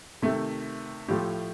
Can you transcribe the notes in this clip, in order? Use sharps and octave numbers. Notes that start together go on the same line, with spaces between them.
C3 D#3 A3
A2 F3 A3 G4